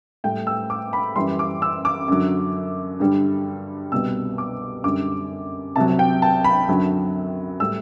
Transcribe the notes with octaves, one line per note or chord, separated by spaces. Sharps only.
A2 G3 G5
E6
D6
B5
F#2 E3 G3 C6
D6
E6
D6
F#2 D3 F#3
G2 D3 G3
C2 B2 G3 E6
D6
F#2 D3 G3 D6
C2 C3 F#3 A5
G5
A5
B5
F#2 D3 F#3
A2 G3 E6